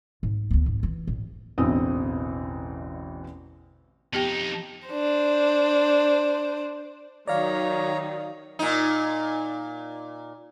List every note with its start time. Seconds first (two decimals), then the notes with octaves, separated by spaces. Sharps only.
0.23 G#2
0.51 D2 B3
0.66 G#2
0.83 E3
1.07 A1
1.58 A1 E2 B2 D3 C4 D#6
4.13 F2 B3 D#4 G4 G5
4.88 D4 C5
7.28 D#3 F#3 D#4 C#5 D5 F5 A#5
8.59 A#2 D#4